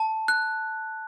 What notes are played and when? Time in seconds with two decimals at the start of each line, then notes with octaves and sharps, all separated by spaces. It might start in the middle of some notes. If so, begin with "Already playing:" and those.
Already playing: A5
0.28 F#6